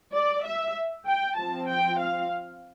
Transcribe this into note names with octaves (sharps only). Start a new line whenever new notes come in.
D5
E5
G5
F3 C4 A5
G5
F5